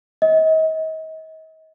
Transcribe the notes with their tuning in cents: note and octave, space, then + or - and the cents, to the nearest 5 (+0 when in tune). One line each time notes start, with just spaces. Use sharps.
D#5 +35